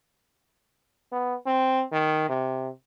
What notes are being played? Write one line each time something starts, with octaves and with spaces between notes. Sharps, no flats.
B3
C4
D#3
C3